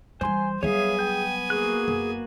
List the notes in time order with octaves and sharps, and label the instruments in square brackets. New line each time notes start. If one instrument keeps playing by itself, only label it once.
[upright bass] E3 G3 [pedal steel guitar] C5 C6 [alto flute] G#5
[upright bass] F#3 G3 [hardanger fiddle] B3 G#5 [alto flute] G#4 [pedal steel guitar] C#5 E5 F5
[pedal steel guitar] G5 G6
[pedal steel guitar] A#3 F#4 F#6 [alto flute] G#4
[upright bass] F#1